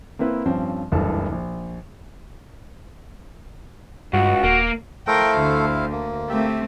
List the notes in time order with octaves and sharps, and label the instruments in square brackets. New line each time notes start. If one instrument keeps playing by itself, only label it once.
[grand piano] A#3 C4 E4 B4
G2 F3 C4 C#4
F#1 C#2 G2 E3 A4 A5
A#1
[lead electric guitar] C#2 [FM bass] G2 [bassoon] F#4
[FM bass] D#1 [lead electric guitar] A#3
[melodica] A3 A4 [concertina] E4 C5 F5 [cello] A#4 G5
[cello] D2 D3
[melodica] A#3
[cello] A3 C4 [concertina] G4 E5